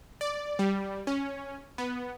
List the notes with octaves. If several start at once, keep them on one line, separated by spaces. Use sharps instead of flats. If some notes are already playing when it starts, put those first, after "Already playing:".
D5
G3
C#4
B3